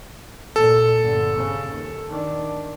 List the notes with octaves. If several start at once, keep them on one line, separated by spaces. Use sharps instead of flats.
A#2 A4
G1 D3
C#3
D#2
D#3 D4